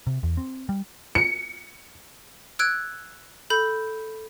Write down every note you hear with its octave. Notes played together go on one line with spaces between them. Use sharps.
C3
E2
C4
G3
C#7
E6 F#6 G#6 D7
A4 B5 G6